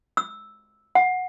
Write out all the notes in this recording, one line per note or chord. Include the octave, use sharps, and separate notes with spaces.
E6
F#5